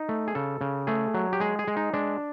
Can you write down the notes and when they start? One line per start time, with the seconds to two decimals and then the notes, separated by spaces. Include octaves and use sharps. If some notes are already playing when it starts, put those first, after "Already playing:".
Already playing: D#4
0.09 A3
0.28 G#4
0.35 C#3 A4
0.61 C#3
0.87 A3 G#4
1.14 F#3
1.33 G4
1.40 G#3 G#4
1.59 G#4
1.68 G#3
1.77 D#4
1.94 G#3 D4